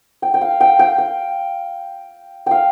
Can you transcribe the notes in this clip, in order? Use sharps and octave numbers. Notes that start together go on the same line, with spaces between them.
G5
G5
F5
G5
G5
G5
F5 G5